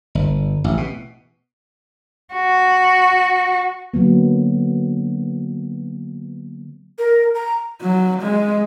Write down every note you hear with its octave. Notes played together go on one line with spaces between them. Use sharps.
G1
A1
B2
F#4
D3 F#3 A#3 B3
A#4
A#5
F#3
G#3